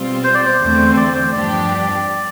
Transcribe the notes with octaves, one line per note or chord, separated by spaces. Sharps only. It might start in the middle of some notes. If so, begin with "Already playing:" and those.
Already playing: B2 G3 C4 F4
C5
D5
C5
E2 D3 A3 C4
D5
C5
G2 F3 B3 D4 G4 D5